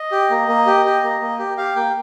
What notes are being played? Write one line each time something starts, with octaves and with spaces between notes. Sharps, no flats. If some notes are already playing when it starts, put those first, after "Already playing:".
Already playing: D#5
G4
A#3
A#3
G4
G4
A#3
A#3
G4
G4 F5
A#3 G5